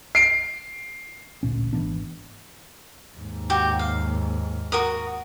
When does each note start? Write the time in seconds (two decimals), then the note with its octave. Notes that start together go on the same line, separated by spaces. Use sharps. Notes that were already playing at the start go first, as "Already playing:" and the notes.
0.15 C7 D7
1.43 A1 D2 A#2 C#4
1.73 G#1 E3 B3 D4
3.18 D#2 G#2
3.50 F#4 G4
3.79 F5
4.72 F#4 A#4 D#6